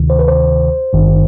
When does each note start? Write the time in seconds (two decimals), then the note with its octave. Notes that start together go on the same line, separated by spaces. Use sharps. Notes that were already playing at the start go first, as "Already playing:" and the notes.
Already playing: D2 C3 D#3
0.10 C5
0.19 B4
0.28 C5
0.93 G#1 G2 D#3